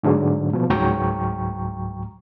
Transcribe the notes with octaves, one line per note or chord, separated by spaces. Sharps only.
G#2 D3 F#3 G#3
B2 F3
C#2 G#2 F#3 G5 A#5 C#6